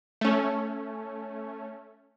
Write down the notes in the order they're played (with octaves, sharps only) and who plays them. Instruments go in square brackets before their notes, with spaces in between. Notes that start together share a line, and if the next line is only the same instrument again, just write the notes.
[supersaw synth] A3 C#4